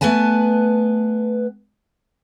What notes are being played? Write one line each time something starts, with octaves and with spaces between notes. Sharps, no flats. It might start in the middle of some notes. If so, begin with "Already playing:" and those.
A3 B3 B4 G#5 A5